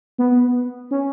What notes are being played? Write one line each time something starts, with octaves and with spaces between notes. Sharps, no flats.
B3
C#4